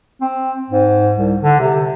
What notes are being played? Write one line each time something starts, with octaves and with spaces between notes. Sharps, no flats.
C4
G#2
C2
D3
C3